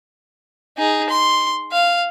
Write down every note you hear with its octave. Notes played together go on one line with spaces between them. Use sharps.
D#4 G#4
C6
F5